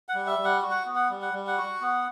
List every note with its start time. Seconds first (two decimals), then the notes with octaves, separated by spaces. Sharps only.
0.09 F#5
0.15 G3
0.27 E5
0.39 G3
0.44 F#5
0.62 F#4
0.70 F#5
0.85 B3
0.95 F#5
1.10 G3
1.22 F#5
1.33 G3
1.47 F#5
1.58 F#4
1.81 B3